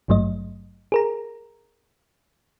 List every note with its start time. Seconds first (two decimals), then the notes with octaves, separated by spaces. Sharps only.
0.08 G#1 G2 F#3 A3 D#5
0.92 G#4 A#4 A#5